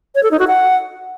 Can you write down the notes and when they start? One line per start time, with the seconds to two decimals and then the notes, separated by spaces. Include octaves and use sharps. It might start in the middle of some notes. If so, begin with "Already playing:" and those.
0.15 C#5
0.23 A4
0.31 D#4
0.39 F#4
0.47 F#5